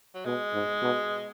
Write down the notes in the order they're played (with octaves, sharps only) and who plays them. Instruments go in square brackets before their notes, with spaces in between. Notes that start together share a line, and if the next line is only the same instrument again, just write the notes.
[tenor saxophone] F#3
[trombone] B2 [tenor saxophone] G#3
[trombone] G#2
B2